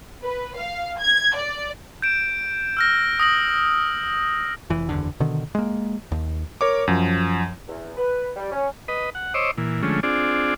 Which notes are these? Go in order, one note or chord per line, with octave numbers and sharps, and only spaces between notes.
B4
F5
G#6
D5
G6 D7 E7
E6 F6 A#6
D#6 A#6 F#7
F1 E3
F#1 E2 D3
B2 D3 D#3
G#3 A#3
D#2
A#4 C#5 D6
F#2 F3
E2
B4
G3
C#4
B4 D#5
F#5
C5 C#5 D#5 D6 E6
A#2 E3
D3 F3 G#3 A3 C#4
C4 D4 F4 G#4 D5